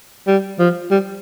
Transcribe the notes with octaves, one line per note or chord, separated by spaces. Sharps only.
G3
F3
G3